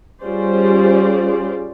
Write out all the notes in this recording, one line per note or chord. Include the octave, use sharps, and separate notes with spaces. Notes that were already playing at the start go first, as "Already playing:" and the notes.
G3 C#4 F4 G#4 C5 D5